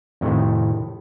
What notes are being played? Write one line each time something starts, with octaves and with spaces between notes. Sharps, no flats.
F2 A2 C3 D#3